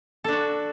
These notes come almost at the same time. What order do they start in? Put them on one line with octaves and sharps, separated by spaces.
A4 D4 F#4